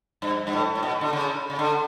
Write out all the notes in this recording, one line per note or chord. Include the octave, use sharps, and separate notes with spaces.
G2
G2
A2
A2
B2
D3
C#3
C#3
D3